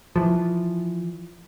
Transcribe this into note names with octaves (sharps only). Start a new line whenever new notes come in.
E3 F3